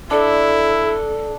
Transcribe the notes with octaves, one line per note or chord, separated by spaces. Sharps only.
D4 E4 A4